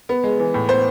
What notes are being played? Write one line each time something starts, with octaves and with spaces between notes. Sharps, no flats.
B3
G#3
E3
A2
B3 C5